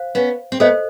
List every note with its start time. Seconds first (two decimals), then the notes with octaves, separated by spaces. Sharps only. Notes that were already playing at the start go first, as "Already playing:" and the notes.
Already playing: C5 F5
0.15 B3 C#4
0.52 C4
0.60 A3 B3 A4 C5 D#5